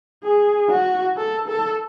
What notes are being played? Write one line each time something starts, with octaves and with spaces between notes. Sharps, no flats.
G#4
F#4
A4
A4